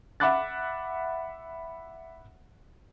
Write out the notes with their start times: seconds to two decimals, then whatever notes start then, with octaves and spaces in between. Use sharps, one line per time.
0.20 E5 F#5 B5 D6 F#6 A6